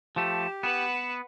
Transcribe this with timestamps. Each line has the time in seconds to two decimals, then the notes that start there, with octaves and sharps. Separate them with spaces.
0.16 F3 A3 G4 E7
0.63 B3 B4 F#5 E7